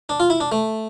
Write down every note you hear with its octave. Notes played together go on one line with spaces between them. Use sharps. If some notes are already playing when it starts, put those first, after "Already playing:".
D4
F4
E4
D4
A3